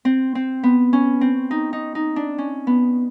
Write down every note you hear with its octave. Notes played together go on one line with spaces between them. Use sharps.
C4
C4
B3
C#4
C4
D#4
D#4
D#4
D4
C#4
B3